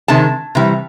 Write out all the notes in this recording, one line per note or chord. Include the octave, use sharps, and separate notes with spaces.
C3 D#3 G#3 A5
C3 E3 G3